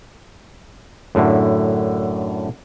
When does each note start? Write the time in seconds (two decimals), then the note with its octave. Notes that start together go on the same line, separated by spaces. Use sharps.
1.15 F#2 A2 D3